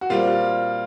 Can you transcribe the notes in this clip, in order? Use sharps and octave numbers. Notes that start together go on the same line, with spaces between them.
F#4
A#2 G3 C4 F4